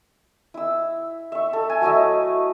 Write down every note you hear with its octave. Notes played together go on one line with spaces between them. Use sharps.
E4 E6
E5 C#6
A4
G#5
F#3 A3 E4 D#5